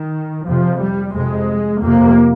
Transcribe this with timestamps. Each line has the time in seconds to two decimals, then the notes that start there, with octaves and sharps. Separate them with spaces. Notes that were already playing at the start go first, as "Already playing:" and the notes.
Already playing: D#3
0.46 F2 C3 F3
0.80 G3
1.14 F2 C3 G#3
1.82 F2 C3 A#3